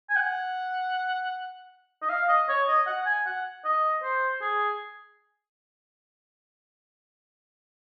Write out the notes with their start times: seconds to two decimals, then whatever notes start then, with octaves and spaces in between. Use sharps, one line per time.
0.10 G#5
0.16 F#5
2.02 D#5
2.09 F5
2.29 D#5
2.49 C#5
2.68 D#5
2.87 F#5
3.06 G#5
3.26 F#5
3.65 D#5
4.03 C5
4.41 G#4